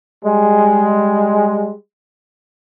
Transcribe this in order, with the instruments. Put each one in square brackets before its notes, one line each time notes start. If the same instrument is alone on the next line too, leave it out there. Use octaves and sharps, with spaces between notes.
[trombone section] G3 G#3